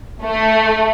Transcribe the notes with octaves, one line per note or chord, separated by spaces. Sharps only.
A3